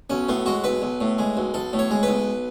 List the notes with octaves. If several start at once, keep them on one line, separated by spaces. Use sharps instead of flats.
B1 C#4
A2 B3
G#3 F#4
B1 B4
B1
A2
G#3
B1
B1 A4
A2
C#5
G#3
B4
B1